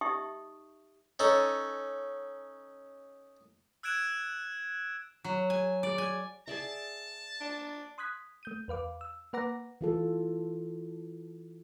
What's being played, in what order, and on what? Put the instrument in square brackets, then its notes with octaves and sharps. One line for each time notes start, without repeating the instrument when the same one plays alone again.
[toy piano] D#4 G4 D#5 E5 C#6 D#6
[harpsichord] C#4 D#4 A4
[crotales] E6 F#6 G#6 D7 E7
[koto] F#3
G#5
D5
G#5
[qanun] G#4 D5 E5 [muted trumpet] A5
[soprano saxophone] D4
[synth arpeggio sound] C6 D#6 F#6 G#6 B6
A3 G6 D#7
E2 B4 F5 D6
E6
A#3 B4 F#5 A#5 D6 A#6
[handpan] E3 F4 A4